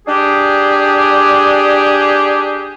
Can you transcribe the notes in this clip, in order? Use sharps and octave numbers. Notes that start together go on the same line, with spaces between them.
D4 G4 G#4